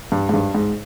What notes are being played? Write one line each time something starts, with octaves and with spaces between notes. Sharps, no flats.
G2
G#2
G2
G#2